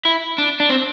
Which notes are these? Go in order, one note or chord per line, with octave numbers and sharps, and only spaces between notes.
E4
D4
D4
C4